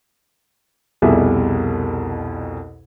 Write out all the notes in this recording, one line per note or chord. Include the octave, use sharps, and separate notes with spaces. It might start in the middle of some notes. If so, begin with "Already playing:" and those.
C2 F2 B2 G3 G#4 E5